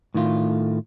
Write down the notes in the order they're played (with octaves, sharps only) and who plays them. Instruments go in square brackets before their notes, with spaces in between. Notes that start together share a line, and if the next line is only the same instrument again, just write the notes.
[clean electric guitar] A2 D#3 A3 F4